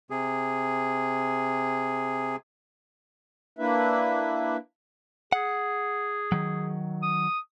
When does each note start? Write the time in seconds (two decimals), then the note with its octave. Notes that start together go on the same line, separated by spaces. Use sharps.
0.10 C3 G#4
3.59 A#3 D4 E4 B4 E5
5.32 G#4 F#5
6.32 D#3 F#3
7.02 D#6